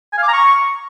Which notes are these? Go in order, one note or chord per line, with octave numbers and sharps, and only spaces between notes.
G#5
F5
D6
A#5
C#6